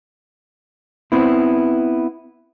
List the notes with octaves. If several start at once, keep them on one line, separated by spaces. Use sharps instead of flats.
B3 C4 E4